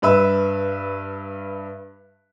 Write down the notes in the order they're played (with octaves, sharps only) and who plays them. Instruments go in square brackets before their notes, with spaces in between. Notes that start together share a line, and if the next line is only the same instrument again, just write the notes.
[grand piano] G2 B4 E5 E6